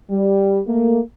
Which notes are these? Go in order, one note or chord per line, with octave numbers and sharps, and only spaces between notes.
G3
A3 A#3